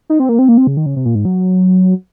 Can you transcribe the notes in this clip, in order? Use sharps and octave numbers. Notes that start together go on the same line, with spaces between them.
D#4
C4
A#3
C4
A#3
C4
C#3
D#3
C#3
C3
A#2
G#2
F#3